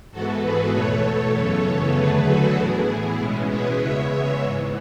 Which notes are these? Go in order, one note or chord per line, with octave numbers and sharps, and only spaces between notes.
G#2 E3 B3 F#4 A4
G#4 B4
E2 B2 A3 A4 C#5
A4 C#5
F#2 C#3 E3 B3
E2 D3 F#3 A3 G#4 B4
F#4 A4
A2 E3 B3 E4 G#4
B2 G#3 B3 C#4 E4
G#4 B4
E2 C#3 G#3 B3 C#5 E5
G#2 E3 B3